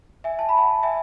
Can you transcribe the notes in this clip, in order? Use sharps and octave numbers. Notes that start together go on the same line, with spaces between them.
E5 G#5
A5
B5
F#5 A5
E5 G#5